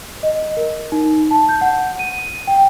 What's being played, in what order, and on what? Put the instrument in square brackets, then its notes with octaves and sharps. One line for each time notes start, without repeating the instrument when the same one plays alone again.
[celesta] D#5
A#4
D#4
A5
G6
F#5
D#7
G5